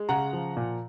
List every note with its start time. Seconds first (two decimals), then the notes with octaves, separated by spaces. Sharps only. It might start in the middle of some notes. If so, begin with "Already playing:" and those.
Already playing: G#3
0.09 C#3 F#5 A#5
0.33 F3
0.57 A#2